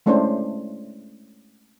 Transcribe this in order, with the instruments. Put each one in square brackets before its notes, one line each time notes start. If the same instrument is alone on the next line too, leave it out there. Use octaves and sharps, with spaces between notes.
[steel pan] G#3 A3 C#4 D4 E4 C5